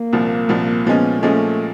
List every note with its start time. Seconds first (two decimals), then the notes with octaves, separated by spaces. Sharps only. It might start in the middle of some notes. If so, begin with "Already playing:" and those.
Already playing: A#3
0.13 C2 A#2 F3
0.49 C2 A#2 F3
0.86 A#2 F3 G#3 B3 C#4
1.22 A#2 F3 G#3 A3 C#4